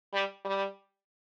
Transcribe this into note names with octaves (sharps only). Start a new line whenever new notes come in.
G3
G3